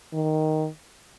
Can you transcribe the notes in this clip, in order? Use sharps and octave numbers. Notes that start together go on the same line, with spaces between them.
D#3